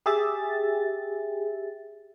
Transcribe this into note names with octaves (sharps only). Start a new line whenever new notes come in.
G4 G#4 E5 A6